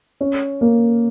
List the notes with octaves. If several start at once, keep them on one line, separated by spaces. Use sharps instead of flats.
C#4
A#3